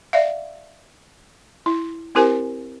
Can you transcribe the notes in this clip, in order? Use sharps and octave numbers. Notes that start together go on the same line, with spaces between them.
D5 E5 F5
E4
C4 E4 G4 A#4 C5 G#5